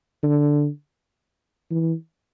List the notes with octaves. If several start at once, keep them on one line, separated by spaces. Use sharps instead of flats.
D3
E3